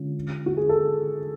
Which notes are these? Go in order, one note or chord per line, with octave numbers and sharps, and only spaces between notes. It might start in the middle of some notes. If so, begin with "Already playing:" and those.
Already playing: D3 G#3 C#4 F4
F#4
G#4
A4